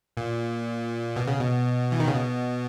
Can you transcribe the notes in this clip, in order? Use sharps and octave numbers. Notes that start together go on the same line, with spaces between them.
A#2
B2
C#3
B2
E3
D#3
C#3
B2